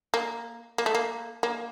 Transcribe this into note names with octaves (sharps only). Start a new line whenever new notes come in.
A#3
A#3
A3
A#3
A#3